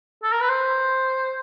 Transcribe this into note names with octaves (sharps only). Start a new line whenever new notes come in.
A4
A#4
B4
C5